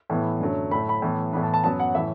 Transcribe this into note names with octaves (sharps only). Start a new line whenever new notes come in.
A2 E3 B3
F#2 D3 F#3 A3
A2 A3 B5
B5
A2 E3 B3
A2 E3 B3 B5
A5
A5
F#2 F#3 B3 A5
F#5
A2 E3 A3 E5